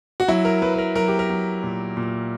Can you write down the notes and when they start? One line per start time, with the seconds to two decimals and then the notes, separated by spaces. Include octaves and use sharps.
0.20 F#4
0.28 F#3 E4
0.45 A#4
0.62 F#3 B4
0.74 B4
0.78 A#4
0.95 F#3 A#4
1.08 G4
1.19 A#4
1.30 F#3
1.63 A#2
1.97 A#2